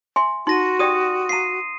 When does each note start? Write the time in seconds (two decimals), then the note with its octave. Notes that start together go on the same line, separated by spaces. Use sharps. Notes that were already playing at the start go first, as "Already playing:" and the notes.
0.16 E5 G#5 C6
0.47 D#4 F#4 C6 A#6 D#7
0.79 G4 D5 G5 D#6 D#7
1.29 F5 A#5 C7 D#7